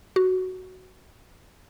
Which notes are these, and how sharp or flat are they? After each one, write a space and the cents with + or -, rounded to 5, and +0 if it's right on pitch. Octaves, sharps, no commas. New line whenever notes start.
F#4 +5